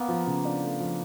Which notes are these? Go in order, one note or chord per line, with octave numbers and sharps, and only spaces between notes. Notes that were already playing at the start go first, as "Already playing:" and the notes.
Already playing: A#3 B3
F3
C#3
D4
A3
F3